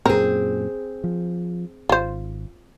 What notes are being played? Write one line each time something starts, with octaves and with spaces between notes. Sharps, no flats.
F#2 A#2 C4 G#4 A#4
F3
G#1 F4 C5